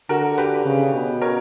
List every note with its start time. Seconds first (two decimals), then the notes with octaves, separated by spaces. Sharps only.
0.09 D3 F#4 A#4
0.38 G4 B4
0.65 C#3
0.93 B2
1.21 A#4 C#5